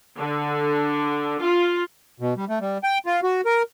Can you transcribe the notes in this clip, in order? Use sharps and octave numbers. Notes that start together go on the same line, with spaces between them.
D3
F4
B2
G3
A3
G3
G5
F4
F#4
A#4